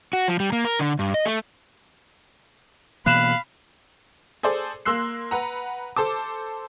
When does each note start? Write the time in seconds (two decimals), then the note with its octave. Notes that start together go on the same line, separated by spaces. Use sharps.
0.13 F#4
0.28 F3
0.40 G3
0.52 A#3
0.65 A#4
0.79 D3
0.99 G2
1.14 D#5
1.25 A3
3.06 B2 E3 A#3 F5 B5 F#6 E7 F#7
4.43 G#4 A4 C5 D5
4.86 A#3 C6 E6 F#6 C7
5.31 B4 F#5 A#5
5.97 A4 C5 A5 D6